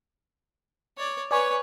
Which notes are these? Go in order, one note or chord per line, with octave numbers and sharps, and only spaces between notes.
C#5 D5
B4 C#5 D5 G#5 C#6